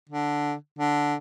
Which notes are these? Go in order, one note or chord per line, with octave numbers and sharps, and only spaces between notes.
D3
D3